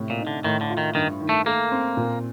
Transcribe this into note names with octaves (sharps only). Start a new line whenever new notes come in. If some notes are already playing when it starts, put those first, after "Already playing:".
Already playing: A2 C3
A#2
D#4
D3
A2 D#3
D3
F4
D#3
G2 D#3
D#3
A3
A3 A#3
C4
A#2